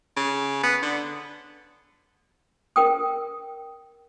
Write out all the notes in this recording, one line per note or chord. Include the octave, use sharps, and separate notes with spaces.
C#3
B3
D3
A#4 G5 D#6